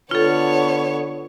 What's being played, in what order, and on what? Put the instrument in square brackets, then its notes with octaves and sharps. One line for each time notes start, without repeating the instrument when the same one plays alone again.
[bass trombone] D3 [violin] B3 C#5 [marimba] F4 A4